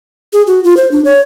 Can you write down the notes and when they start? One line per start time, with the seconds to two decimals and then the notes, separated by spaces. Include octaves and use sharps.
0.33 G#4
0.47 F#4
0.64 F4
0.77 C5
0.91 D4
1.05 C#5